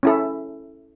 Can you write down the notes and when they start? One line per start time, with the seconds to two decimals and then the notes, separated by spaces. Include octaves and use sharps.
0.03 C#4 E4 A4